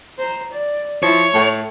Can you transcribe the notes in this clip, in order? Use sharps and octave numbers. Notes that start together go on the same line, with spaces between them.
C5 A#5
D5
F3 E4 C#5
A2 A3